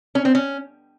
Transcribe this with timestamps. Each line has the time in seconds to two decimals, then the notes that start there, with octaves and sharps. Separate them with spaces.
0.15 C#4
0.25 C4
0.35 C#4